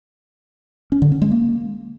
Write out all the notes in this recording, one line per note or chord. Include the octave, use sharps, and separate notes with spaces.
C#4
D3
C#4
G#3
A#3